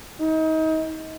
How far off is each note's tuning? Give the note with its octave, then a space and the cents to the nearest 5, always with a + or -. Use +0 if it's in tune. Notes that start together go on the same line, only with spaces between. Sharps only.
D#4 +30